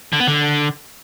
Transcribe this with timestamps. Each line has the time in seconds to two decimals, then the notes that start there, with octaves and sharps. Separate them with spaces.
0.13 D3
0.20 B3
0.27 D3